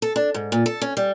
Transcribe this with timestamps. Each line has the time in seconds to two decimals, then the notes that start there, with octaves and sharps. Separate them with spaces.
0.02 A4
0.16 D4
0.34 G#2
0.52 A#2
0.66 A4
0.82 C#4
0.97 G3